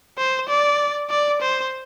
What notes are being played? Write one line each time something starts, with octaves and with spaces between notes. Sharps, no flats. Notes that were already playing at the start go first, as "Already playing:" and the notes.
C5
D5
D5
C5